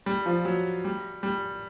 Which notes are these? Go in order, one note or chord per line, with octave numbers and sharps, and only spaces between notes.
G3
F3
F#3
G3
G3